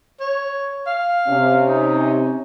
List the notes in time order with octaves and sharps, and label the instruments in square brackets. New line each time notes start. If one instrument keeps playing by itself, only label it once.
[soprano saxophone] C#5
F5
[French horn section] C3 C#4
[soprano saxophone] D#4